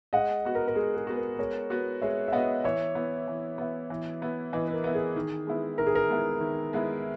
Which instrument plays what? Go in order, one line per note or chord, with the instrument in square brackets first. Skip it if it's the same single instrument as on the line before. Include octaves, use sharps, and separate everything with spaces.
[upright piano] G#3 [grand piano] D#5 F#5
[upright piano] B3 F#4
[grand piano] A#4
A#4
[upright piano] G#3 [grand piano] G#4
[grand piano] G#4
[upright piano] B3 F#4 [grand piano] G#4
[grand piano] A#4
B4
[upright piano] G#3 [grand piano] A#4 C#5
[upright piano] B3 F#4
[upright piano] G#3 [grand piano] C#5 E5
[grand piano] E5
[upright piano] B3 F#4 [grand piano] D#5 F#5
[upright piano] E3 [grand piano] C#5 E5
[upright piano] B3 E4
E3
B3 E4
E3
B3 E4
[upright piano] E3 [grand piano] B4 D#5
[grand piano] B4
A#4
[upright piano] B3 E4
[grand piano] G#4
[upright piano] D#3
G#3 B3 E4
[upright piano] D#3 [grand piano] A#4
[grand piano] G#4
A#4
[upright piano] G#3 B3 E4
D#3
G#3 B3 E4